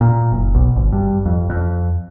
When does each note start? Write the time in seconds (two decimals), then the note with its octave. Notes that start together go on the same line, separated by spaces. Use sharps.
0.01 A#2
0.32 F#1
0.55 B1
0.76 G#1
0.92 G2
1.26 F2
1.50 F2